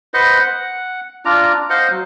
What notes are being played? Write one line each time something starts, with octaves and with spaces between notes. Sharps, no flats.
B4 C5 D#5 F#5
F#5
D4 F4 D5 A#5
C5 D#5 F5 F#5
F#3